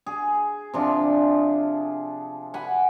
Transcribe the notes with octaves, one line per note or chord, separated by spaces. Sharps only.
G#4
C3 F3 D4
F#5 G#5 B5